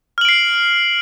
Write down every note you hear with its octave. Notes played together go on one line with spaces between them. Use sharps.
F6 C7 D7 F#7